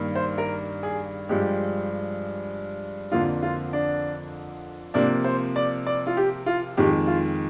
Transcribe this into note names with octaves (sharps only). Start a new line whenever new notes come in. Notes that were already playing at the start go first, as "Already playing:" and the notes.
Already playing: G2 D#3 A#3
C5
A#4
G#4
G2 F3 G#3 G4
F2 D3 F3 A#3 F4
F4
D4
C3 F3 A#3 D4
C5
D5
D5
F4
G4
F4
F2 D#3 G#3 G4
F4